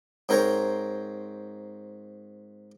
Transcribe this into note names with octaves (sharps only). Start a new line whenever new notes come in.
G#2 C4 A#4 C5 C#5 A#5